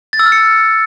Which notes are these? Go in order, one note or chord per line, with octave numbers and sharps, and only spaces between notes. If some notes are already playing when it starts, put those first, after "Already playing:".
A6
E6
F6
C#7